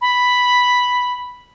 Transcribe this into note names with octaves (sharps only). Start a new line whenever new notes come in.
B5